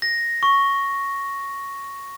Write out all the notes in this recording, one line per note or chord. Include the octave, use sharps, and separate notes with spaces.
A#6
C#6